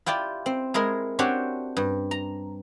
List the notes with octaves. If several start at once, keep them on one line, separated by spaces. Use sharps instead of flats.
E4 F4 G4 D5
C4
G#3 E4 G#4 A#4
C4 D4 F#4 G4 C#5
G2
A#5